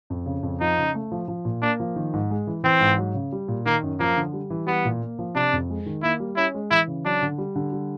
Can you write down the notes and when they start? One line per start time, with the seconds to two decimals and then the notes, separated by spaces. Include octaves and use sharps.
0.10 F2
0.26 C#3
0.43 F2
0.61 F3 D#4
0.78 C#3
0.95 A3
1.12 F3
1.28 F3
1.45 A#2
1.62 A#3 D4
1.80 F3
1.96 D#3
2.13 G#2
2.31 G#3
2.47 E3
2.64 E3 C4
2.80 G#2
2.98 F#3
3.14 C#3
3.32 G3
3.48 A#2
3.66 D#3 A#3
3.83 F#2
4.00 F3 A#3
4.17 D3
4.33 G3
4.50 E3
4.67 G3 B3
4.85 A#2
5.02 A#3
5.19 F3
5.35 C3 D4
5.53 F2
5.70 G#3
5.86 D#3
6.03 A#3 E4
6.20 G3
6.37 C#4 E4
6.55 G#3
6.71 E3 E4
6.87 C#3
7.05 F#3 D4
7.22 D3
7.38 G3
7.56 D3
7.73 G3